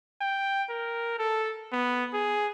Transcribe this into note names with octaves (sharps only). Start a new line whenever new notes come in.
G5
A#4
A4
B3
G#4